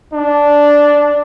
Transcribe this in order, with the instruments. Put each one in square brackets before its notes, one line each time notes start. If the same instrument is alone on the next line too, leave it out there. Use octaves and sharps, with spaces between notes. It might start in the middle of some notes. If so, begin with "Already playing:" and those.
[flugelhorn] D4